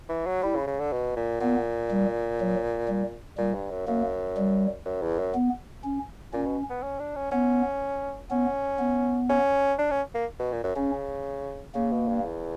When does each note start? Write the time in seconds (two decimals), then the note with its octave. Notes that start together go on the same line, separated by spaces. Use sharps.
0.09 E3
0.27 F#3
0.42 G3 E4
0.56 C#3
0.67 C#3
0.80 D3
0.92 B2
1.16 A#2
1.41 A#2 B3
1.91 G3
2.40 F#3
2.88 G3
3.38 A#2 G3
3.54 G2
3.71 F#2
3.87 F#2 A#3
4.37 G3
4.86 F#2
5.02 E2
5.19 F#2
5.34 B3
5.84 C#4
6.33 A#2 C#4
6.46 B2
6.70 B3
6.83 C#4
6.99 D4
7.16 C#4
7.32 B3 C#4
8.31 B3 C#4
8.79 B3
9.29 C#4
9.78 D4
9.91 C#4
10.15 A#3
10.40 B2
10.52 A#2
10.64 F#2
10.76 C#3 C#4
11.75 C#3 A#3
11.92 B2
12.08 G2
12.25 E2